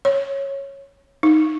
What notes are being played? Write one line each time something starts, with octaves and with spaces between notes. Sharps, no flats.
C#5
D#4